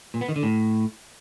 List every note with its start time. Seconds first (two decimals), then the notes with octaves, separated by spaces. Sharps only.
0.14 A#2
0.21 B3
0.29 D#3
0.36 D3
0.43 A2